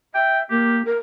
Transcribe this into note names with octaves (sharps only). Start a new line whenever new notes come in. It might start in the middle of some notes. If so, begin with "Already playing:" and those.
E5 G5
A#3 G4
A#4